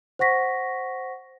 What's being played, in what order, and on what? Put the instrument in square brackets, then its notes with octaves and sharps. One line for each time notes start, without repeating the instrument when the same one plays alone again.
[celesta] C5 F#5 C#6 A#6 B6